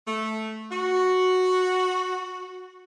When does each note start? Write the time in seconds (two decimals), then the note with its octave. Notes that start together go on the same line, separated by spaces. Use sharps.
0.06 A3
0.71 F#4